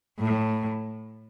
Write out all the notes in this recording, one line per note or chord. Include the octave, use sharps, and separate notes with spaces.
A2